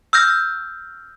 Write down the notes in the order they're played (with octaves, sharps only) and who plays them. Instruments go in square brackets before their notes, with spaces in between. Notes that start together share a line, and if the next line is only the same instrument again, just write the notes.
[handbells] E6 F6 G6 A#6